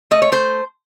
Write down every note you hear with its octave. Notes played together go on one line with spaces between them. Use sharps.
A3 D#5
C#5
A3 C5